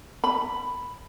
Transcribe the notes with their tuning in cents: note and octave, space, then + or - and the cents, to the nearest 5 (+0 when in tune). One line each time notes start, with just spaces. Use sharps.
B5 +5